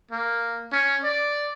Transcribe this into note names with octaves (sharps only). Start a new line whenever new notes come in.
A#3
C#4
D5